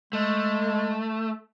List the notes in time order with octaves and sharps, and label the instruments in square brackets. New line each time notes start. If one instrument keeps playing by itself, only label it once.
[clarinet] G#3 [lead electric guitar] A3